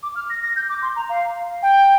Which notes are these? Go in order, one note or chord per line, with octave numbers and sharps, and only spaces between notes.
D6
F6
A#6
A#6
G6
D6
C6
A#5
F5
G5